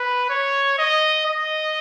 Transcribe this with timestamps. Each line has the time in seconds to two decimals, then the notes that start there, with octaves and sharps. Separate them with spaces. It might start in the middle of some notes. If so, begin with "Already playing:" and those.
Already playing: B4
0.30 C#5
0.79 D#5
1.26 D#5